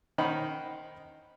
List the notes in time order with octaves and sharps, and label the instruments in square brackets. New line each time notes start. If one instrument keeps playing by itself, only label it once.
[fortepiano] D#3 C#4 D#4 C5 F#5 B5